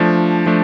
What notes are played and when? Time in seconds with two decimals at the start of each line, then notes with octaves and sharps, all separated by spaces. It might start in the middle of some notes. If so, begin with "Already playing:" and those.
Already playing: F3 A3 D4
0.46 F3 A3 D4